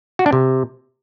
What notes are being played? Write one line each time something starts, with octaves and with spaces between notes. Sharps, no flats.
F#4
D4
C3